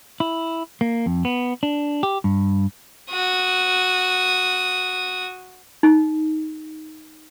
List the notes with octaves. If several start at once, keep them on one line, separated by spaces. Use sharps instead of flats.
E4
A#3
F2
B3
D4
G4
G2
F#4 D#6
D#4